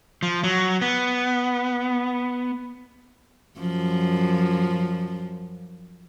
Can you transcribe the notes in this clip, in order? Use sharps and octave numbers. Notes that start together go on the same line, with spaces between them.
F3
F#3
B3
F#2 F3